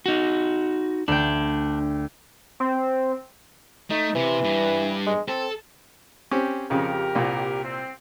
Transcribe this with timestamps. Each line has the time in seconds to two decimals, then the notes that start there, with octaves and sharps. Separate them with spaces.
0.06 D#4 F#4
1.08 D2 D4 G5
2.60 C4
3.90 A3 D#4
4.15 C3 E3
4.44 G2
5.07 G#3
5.28 C4 A4
6.31 C4 C#4 G4
6.70 F2 C#3 G4 A#4
7.15 C2 A#2
7.64 C4